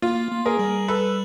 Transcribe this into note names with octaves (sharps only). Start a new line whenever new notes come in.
A#3 F4
A#3
G#4 A#4
G3
A4 B4